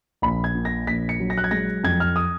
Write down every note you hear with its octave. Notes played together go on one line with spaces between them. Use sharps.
A#1 B5
G#6
A#2
A#6
A#1 B6
C#7
F#3
A#6
F#6
G#6
G#3 A#6
F2 G#6
F6
D#6